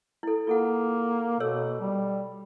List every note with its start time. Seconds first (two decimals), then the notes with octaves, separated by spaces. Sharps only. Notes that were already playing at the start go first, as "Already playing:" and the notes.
0.23 E4 A4
0.47 A#3 F4 A4 F#5
1.40 B2 A4 C#5 E6
1.80 G3